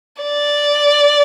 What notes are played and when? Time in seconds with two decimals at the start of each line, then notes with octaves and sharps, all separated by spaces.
0.23 D5